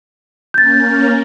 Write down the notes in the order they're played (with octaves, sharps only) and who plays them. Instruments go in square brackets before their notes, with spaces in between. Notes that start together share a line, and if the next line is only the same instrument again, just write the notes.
[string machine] A#3 C#4 A#4 [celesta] G6 A6